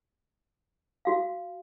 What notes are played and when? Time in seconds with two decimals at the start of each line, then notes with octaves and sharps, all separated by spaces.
1.05 F#4 F5